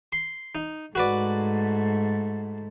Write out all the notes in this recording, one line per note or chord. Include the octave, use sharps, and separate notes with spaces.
C6
D#4
G#2 A3 F#4 B4 D5